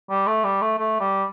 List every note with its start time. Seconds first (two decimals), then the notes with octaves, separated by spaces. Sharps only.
0.10 G3
0.27 A3
0.44 G3
0.62 A3
0.78 A3
1.00 G3